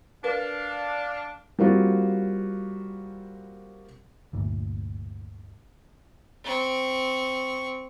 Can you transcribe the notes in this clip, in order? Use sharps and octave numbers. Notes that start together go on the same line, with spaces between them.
D4 A#4 B4 F5
G3 A#3 C4 F4 F#4
G1 D2 A#2
C4 C#6